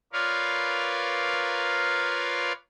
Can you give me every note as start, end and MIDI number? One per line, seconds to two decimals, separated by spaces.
0.13 2.52 65
0.13 2.52 70
0.13 2.52 71
0.13 2.52 73
0.13 2.52 74
0.13 2.52 77